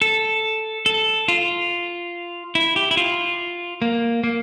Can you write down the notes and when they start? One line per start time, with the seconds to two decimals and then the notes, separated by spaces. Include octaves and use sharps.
0.02 A4
0.86 A4
1.28 F4
2.55 E4
2.76 G4
2.91 E4
2.97 F4
3.82 A#3
4.24 A#3